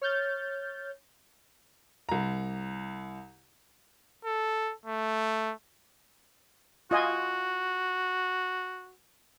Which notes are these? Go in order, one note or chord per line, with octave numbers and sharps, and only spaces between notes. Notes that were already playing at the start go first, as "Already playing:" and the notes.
C#5 F6 G6 A6
C2 A#5
A4
A3
F4 F#4 D#5 G#5